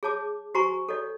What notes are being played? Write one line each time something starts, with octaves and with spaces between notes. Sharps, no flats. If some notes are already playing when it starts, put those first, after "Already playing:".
G#4 C#5 A5 D6
F#4 C5 G#5 A#5 C#6
A4 C#5 D5